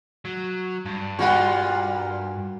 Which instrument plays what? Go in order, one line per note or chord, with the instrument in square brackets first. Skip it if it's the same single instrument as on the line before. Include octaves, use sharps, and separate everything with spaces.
[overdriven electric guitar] F#3
G2
[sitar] A#2 G3 F4 [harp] F#4 F#5